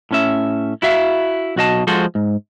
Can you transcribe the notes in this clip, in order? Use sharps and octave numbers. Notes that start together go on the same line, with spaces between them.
A2 C#4 E5
E4 F#4 E5 F5
B1 F#4 D#5 A5
F3 G#3 F4 F#4 A4 C5
G#2